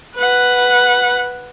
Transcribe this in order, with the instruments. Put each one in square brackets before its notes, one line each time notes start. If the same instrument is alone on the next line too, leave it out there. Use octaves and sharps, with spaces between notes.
[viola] B4 F#5